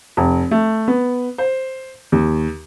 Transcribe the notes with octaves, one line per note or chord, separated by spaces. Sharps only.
F1
A3
B3
C5
D#2